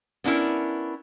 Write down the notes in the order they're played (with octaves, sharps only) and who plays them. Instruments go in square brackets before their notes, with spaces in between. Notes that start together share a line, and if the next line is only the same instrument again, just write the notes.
[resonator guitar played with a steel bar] B3 C#4 D4 E4 A#4